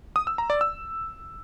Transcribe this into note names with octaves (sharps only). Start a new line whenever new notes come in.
D#6
E6
A#5
D5
E6